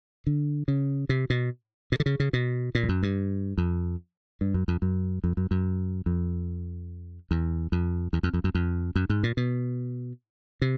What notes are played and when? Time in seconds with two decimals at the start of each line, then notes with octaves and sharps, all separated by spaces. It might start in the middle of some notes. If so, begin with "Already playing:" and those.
0.27 D3
0.68 C#3
1.09 C3
1.30 B2
1.92 B2
2.00 D3
2.06 C#3
2.20 C#3
2.33 B2
2.75 A#2
2.83 F2
2.89 F#2
3.03 G2
3.58 F2
4.41 G2
4.54 F#2
4.68 F2
4.82 F#2
5.24 F2
5.37 F#2
5.51 F#2
6.06 F2
7.31 E2
7.72 F2
8.13 E2
8.23 F2
8.34 F2
8.44 F#2
8.55 F2
8.96 F#2
9.10 G#2
9.23 A#2
9.37 B2
10.62 C3